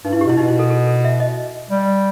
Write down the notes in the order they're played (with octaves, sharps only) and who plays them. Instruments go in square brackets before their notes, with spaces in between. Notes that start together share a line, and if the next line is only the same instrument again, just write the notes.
[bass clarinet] G2 [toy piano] D#4
[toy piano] E4
[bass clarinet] G2
[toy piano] G4
[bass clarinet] B2
[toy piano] E4
[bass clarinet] B2 [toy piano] D#4
[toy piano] E4
A4
A4
A4
E5
D#5
[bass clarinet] G3